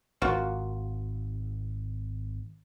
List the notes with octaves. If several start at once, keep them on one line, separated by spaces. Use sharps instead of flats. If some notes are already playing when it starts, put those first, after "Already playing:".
G#1 A#3 F4 F#4